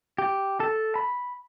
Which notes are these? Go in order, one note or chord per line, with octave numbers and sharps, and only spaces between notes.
G4
A4
B5